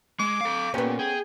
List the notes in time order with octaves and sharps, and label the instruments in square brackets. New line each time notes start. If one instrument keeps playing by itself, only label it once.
[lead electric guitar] G#3 [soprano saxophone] D6
[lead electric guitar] A4 F5
[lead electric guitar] A#2 [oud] B3 C#4 [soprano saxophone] G4
[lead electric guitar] G#4 [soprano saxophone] G5